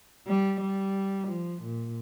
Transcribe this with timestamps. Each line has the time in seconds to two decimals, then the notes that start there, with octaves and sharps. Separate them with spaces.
0.27 G3
0.60 G3
1.28 F3
1.61 A#2